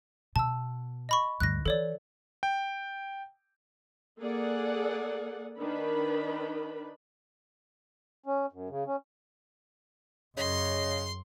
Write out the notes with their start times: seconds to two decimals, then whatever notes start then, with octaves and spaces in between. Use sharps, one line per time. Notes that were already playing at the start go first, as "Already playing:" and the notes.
0.36 B2 A5 E6
1.09 D#5 B5 C#6
1.40 D2 G2 F#6 A#6
1.66 E3 A4 C#5 D5
2.43 G5
4.21 A#3 G#4 A4 D5 F#5
5.58 D#3 D4 B4 B5
8.26 C#4
8.52 F#2
8.69 C#3
8.87 C#4
10.37 F#2 C#3 D#5 C6